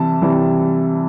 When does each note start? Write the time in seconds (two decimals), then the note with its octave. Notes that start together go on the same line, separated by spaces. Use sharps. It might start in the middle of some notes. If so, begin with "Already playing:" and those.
Already playing: C3 E3 G3 A5
0.22 C3 E3 G3